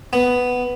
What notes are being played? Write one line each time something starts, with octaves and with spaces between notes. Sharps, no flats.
B3